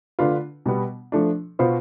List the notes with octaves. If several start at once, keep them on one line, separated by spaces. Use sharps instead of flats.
D3 A3 D4 F4 B4
B2 G3 B3
F3 A3 D4
B2 B3 F4 C5